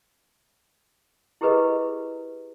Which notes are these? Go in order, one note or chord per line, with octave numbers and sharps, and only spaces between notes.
E4 G4 G#4 A#4 B4 D#5